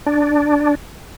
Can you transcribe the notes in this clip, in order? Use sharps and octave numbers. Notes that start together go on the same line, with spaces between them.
D4